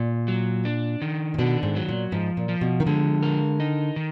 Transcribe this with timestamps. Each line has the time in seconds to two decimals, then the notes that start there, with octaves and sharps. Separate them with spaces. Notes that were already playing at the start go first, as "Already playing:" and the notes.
Already playing: A#2
0.28 F#3
0.65 D4
1.02 D#3
1.34 A#2
1.39 B2 D4
1.63 G#2
1.76 F#3
1.89 A#2
2.12 G#2 F3
2.37 A#2
2.49 F3
2.61 B2
2.80 D#3
2.86 D3 G#3
3.23 A#4
3.60 D#4
3.96 D#3